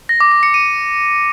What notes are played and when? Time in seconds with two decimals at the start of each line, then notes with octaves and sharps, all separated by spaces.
0.09 A#6
0.20 D6
0.32 D6
0.43 C#7
0.54 D#7